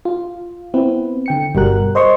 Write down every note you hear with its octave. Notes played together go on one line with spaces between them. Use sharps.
F4
B3 C4 E4 B4
D3 G5 C#7
G1 B2 G3 F#4 A#4 F#6
C5 D#5 C6 C#6